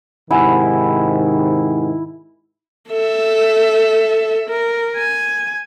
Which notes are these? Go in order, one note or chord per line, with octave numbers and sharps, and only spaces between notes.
G#2 C3 D#3 E4 F#5 G#5
A4 E5
A#4
G#5